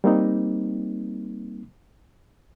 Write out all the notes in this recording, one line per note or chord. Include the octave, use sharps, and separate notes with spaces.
G3 A#3 C4 D#4